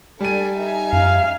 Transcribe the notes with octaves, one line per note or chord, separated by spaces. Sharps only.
G3 D4 A4 G#5 D#7
D#4 E5 G#5
F#2 F5